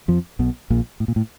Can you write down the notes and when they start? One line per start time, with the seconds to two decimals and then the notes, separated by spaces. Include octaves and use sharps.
0.08 F2 F3
0.39 B1 B2
0.70 A#1 A#2
1.00 A2
1.08 A#2
1.16 A2